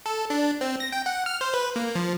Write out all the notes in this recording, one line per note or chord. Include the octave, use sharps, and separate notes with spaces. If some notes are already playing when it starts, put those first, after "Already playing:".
A4
D4
C4
A#6
G5
F#5
F6
C5
B4
A#3
F3